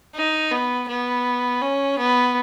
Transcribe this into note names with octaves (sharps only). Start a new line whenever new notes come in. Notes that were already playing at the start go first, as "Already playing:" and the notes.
D#4
B3
B3
C#4
B3